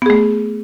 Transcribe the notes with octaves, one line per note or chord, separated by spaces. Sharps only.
A3 B3 G#4